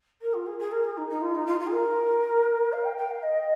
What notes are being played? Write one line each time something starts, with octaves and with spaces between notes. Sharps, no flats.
A#4
F4
G#4
G#4
A#4
G#4
D#4
D#4
F4
D#4
F4
F4
G#4
A#4
F5
G5
G5
F5
D#5